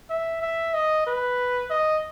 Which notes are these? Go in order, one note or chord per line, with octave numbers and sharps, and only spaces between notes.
E5
E5
D#5
B4
D#5